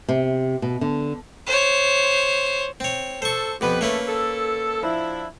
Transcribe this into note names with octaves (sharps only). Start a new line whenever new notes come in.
C3
B2
D3
C5 C#5
C4 C#5
A4 C5 C#6
F2 B3 G4 B4
A3 A#3 C#4 B4
A4
F3 D4 E4